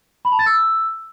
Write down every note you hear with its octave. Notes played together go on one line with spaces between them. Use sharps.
B5
A5
A6
E6